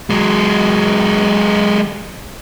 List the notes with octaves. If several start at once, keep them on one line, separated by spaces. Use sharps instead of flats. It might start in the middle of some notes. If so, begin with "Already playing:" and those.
F#3 G#3